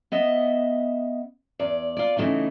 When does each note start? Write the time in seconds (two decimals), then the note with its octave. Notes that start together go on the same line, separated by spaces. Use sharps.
0.12 B3 D#5 E5
1.59 E2 D5
1.97 F4 D5
2.17 C#3 E3 G#3 A3 D#4 E4